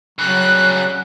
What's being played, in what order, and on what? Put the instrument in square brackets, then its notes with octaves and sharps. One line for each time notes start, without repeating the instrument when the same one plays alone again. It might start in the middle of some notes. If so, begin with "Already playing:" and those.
[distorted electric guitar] C#3 G3 [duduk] F#3 [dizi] F#6